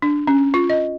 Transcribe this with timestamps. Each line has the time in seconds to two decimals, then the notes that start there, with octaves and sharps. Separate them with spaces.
0.02 D4
0.27 C#4
0.54 F4
0.70 D#5